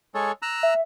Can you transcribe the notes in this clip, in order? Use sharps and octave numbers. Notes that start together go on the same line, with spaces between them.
G#3 A4 C#5
A#5 E6 F#6
E5